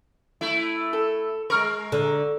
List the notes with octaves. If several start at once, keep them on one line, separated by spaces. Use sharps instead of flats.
A3 E4
A4
G#3 A#4 C#6 F6
D3